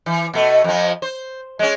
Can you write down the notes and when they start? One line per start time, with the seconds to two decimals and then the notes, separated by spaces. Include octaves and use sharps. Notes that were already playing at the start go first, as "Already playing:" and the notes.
0.06 E3
0.34 B2 A3
0.64 F2 F3
1.02 C5
1.59 G#3 C#4